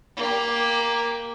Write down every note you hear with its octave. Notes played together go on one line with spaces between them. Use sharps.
A#3 G4